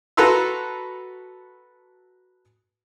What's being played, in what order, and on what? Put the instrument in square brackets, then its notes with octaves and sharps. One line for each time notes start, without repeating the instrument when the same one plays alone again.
[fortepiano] F#4 A4 B4 A#5 C6 E6